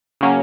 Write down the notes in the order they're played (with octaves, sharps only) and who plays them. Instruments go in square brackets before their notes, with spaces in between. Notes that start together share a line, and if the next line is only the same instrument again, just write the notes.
[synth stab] C#3 F#3 A#3 C#4